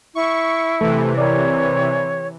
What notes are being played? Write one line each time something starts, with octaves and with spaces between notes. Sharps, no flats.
E4 C#6
C3 E3 A3
A#4 C#5 D5